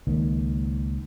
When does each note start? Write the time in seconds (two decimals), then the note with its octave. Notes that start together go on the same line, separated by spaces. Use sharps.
0.07 C#2 D#3 A#3